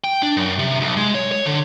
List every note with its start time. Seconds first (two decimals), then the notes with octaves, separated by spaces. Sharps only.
0.04 G5
0.23 D4
0.37 F#2
0.59 C3
0.81 B1
0.97 G#3
1.15 C#5
1.32 C#5
1.46 D3